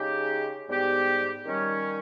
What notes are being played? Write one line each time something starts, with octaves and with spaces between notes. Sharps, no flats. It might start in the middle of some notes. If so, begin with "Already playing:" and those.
Already playing: C#3 G#3 D#4 G4
G#2 G3 B3 G4
D#3 G3 C#4